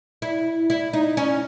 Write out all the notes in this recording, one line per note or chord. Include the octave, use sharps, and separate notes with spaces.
E4
E4
D#4
C#4